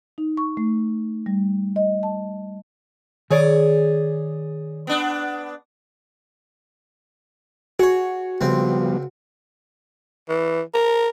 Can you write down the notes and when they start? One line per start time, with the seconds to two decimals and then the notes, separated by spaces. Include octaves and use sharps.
0.18 D#4
0.37 C#6
0.57 A3
1.26 G3
1.76 D#5
2.03 A5
3.30 D#3 G#4 C#5 D5
4.87 B3 D4
7.79 F#4 G#4 C#5
8.41 C#2 F3 G3 B3 C4
10.29 E3
10.74 A#4